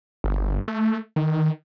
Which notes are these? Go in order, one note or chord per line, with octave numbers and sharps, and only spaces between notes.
G1
A3
D#3